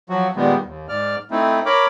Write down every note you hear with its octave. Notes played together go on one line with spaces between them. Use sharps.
F3 F#3 F#4
A#2 D#3 G3 G#3 B3
D#2
G#2 D5 F6
A3 C4 D#4 E4
A#4 C#5 B5 D6